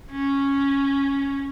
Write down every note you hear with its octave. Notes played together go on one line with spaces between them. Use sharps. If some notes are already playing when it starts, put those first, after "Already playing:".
C#4